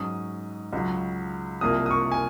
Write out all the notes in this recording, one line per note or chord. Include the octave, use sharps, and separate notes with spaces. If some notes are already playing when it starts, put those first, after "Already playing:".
Already playing: G#2 F#3 C#4 D#6
C#2 C#3 F#3
C2 C3 F3 A#3 D#6
D#6
C#6
G#5